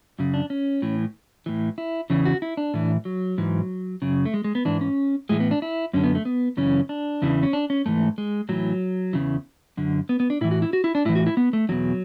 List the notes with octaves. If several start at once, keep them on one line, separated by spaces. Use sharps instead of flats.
F#2 C#3
D4
C#4
A2 E3
A2 E3
E4
E2 C#3 E3
F#4
E4
D4
A2 E3
F#3
G#2 E3
F#2 C#3
A3
G#3
G#3
B3
G#2 E3 D4
C#4
A2 E3 G#3
B3
D4
E4
F#2 D3 C#4
B3
A3
B3
F#2 C#3 E3 C#4
D4
E2 C#3 E3
C#4
D4
C#4
G#2 E3 A3
G#3
A2 E3 F#3
E2 C#3 E3
F#2 D3
B3
B3
D4
A2 E3 E4
F#4
E4
F#4
E4
D4
A2 E3 E4
F#4
E4
B3
A3
E2 B2 F#3